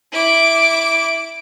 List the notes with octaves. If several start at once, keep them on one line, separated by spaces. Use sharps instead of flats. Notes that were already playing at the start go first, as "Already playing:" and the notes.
E4 D6